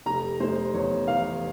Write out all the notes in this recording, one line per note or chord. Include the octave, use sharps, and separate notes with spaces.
F1 A#5
F1 C5
E2 C#5
E3 F5